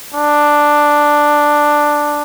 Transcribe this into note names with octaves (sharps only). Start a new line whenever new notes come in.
D4